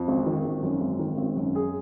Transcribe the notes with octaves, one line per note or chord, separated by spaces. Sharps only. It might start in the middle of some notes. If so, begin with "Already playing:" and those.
Already playing: F2
G#1
D#3
G#1
F#2
G#1
D#3
G#1
F#2
G#4